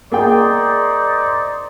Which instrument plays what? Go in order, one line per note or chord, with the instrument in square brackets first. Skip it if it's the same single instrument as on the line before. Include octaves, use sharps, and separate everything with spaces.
[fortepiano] A#3 G#4 G5 [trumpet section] D#4 C5 D5